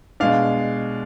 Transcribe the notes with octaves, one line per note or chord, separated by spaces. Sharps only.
B2 G#3 D4 F5